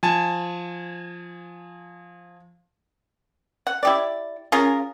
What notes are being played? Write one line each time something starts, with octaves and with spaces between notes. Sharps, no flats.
F3 G#5 A5
F#5
E4 G4 D5
C#4 F4 G#4 A#4